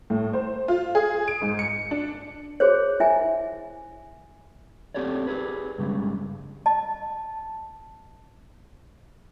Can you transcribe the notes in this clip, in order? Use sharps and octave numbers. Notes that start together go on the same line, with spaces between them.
A2
C5
F4
G#4
D7
G#2
C#7
D4
F#4 G#4 C5 C#5
E4 E5 G#5
C4 G4 A4 C#5 D5
G4 G#4 B4
G2 C#3 F3 G3 G#3
D#5 A5